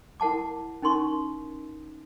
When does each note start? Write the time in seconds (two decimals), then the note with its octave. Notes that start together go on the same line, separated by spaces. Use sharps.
0.20 E4 A#4 F#5 A5 D6
0.82 C#4 D#4 A#4 C6 C#6